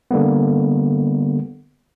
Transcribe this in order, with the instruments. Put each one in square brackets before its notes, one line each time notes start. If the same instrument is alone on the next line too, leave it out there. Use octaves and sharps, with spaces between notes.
[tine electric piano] D3 G3 A#3 B3